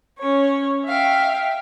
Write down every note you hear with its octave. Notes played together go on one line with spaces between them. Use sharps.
C#4 C#5
E5 F5 G5